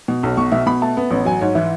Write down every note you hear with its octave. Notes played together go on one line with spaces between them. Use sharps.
B2
B1
B2 C#6
B2 E5
B2 B5
A3 A5
B3
A1
F#3 G#5
G#2 C#5
E3 E4